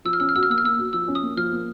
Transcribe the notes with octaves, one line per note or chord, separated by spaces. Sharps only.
F3 E6
F6
C#4 E6
F6
F#4 E6
F6
A#3 E6
F6
A#3 E6
F#4
F3 E6
C#4
D#6
A#3
F3 F6
A#3